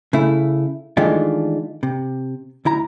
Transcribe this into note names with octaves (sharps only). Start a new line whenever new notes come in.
C#3 A3 E4
D#3 E3 G#3 A3 D4 F4
C3
D2 E4 A#5